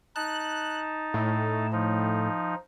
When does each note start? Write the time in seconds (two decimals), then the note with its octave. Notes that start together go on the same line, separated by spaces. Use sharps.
0.16 D#4 A5 F#6
1.14 A2
1.72 F3 D#4